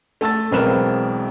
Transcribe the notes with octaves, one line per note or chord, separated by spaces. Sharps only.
A3 A5 E6 A6
E1 B1 C4 A#4 B4 E7